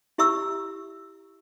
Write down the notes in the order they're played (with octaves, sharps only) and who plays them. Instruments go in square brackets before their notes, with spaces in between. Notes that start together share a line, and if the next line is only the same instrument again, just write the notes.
[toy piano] E4 G4 E5 A#5 C#6 E6